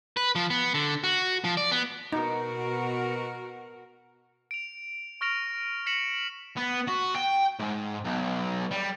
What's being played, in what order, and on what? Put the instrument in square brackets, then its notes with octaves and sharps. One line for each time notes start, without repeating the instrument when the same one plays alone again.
[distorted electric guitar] B4
F3
B3
D3
F#4
F3
D5
B3
[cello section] B2 F#4 A#4 [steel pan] D#4
[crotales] D7 F7
C#6 F6 A#6 D7 F7
A#6 B6 C#7 E7 F#7
[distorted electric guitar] B3
F#4
G5
G#2
B1
G3